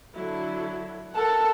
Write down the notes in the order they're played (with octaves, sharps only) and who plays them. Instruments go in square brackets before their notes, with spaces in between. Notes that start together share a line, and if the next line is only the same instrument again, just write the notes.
[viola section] D3 F#3 E4
[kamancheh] A4 [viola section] A#4 F#5 A5